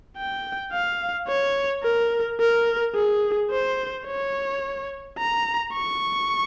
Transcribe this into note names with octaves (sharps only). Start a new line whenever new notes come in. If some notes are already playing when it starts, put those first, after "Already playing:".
G5
F5
C#5
A#4
A#4
G#4
C5
C#5
A#5
C#6